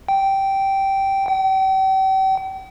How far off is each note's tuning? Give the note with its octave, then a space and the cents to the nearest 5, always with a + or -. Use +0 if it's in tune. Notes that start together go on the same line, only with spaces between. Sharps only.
G5 -10
G5 -40